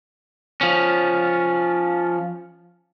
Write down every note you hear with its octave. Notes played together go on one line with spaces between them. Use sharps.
F3 C#4